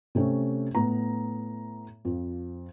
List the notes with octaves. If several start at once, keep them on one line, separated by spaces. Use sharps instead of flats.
C3 A3 C4 C#4
A2 B3 A#5
F2 F3